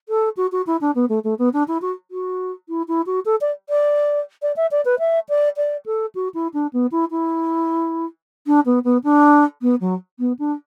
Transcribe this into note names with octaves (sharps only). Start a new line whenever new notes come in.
A4
F#4
F#4
E4
D4
B3
A3
A3
B3
D4
E4
F#4
F#4
E4
E4
F#4
A4
D5
D5
D5
E5
D5
B4
E5
D5
D5
A4
F#4
E4
D4
B3
E4
E4
D4
B3
B3
D4
B3
F#3
B3
D4